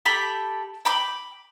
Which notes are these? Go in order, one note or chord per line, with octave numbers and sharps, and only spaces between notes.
G4 A4 G5 B5
G5 B5 D6